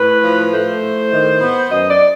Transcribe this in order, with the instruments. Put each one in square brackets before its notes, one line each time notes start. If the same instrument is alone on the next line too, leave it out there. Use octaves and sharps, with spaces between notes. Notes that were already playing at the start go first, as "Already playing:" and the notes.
Already playing: [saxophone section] A2 B4
F3
A3 C5
A2
D#3
B3
F#2 D#5
D5